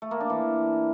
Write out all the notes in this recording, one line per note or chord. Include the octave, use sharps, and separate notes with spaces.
A3
A#3
D4
E3